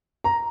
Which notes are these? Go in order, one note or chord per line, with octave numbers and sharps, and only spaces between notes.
A#5